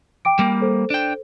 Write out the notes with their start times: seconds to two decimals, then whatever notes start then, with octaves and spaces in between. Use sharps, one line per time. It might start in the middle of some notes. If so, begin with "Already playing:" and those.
0.25 G5 D6 D7
0.39 G3 A#3
0.61 A4 C5
0.90 D4 G5